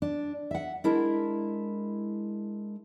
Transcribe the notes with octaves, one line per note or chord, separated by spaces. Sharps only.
D4
E5 F#5
G#3 D4 E4 A#4